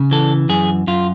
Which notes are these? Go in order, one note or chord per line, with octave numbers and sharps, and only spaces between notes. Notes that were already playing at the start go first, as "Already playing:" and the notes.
Already playing: C#3
E3 A4
F#2 G#4
F#2 F4